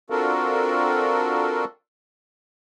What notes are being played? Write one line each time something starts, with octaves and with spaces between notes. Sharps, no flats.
C4 D4 F4 F#4 A4 A#4